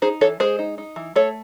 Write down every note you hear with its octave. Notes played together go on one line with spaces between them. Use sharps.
D#4 G#4 C5
E3 A4 C#5
G#3 G#4 C5
D#4
D#4
E3
A3 A4 C#5